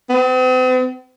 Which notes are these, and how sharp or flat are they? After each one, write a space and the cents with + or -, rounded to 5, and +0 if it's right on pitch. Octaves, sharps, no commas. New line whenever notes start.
C4 -45